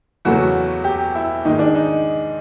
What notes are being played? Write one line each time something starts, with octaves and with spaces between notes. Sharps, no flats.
E2 C#3 F#3 A3 F#4
G4
E4
G#2 D#3 G#3 D#4
D4
D#4